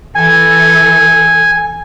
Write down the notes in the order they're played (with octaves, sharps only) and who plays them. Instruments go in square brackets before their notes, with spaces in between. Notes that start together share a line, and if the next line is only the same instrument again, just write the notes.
[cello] E3 A4 [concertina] G#5